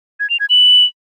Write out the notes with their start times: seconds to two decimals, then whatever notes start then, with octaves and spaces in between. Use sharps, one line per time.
0.20 G#6
0.30 F7
0.40 G#6
0.50 F#7